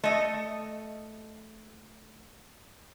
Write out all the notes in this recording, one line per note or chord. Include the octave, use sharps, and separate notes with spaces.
A3 D#5